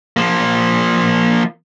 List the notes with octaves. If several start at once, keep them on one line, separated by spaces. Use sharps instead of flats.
F3 A#3